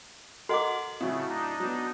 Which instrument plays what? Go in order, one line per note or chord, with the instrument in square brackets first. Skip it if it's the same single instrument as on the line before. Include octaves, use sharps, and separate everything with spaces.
[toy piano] F#4 D6 [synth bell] A4 D#5 F#5 [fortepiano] A#4
[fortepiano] A2 F#3 [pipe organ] C#3 A3 [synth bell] C4
[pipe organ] D4 D#4
[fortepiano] F#3 B3